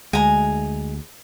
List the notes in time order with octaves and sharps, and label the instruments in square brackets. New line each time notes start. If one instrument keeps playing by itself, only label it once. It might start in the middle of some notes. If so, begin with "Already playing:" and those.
[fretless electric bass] D2 [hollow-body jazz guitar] G#3 [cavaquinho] G#5 A#5